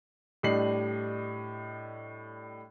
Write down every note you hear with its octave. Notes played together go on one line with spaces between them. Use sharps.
A2 G3 D4 D#5 C7 F#7